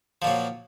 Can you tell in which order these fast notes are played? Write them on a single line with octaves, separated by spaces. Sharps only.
F3 A#2 F#3